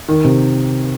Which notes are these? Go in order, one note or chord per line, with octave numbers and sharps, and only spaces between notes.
D#3
C3